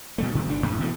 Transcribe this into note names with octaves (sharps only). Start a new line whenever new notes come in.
B2 G3 A3
B2 D#3 G3
G1 A3 D4
F#2 A2
B2 E3 G3 A3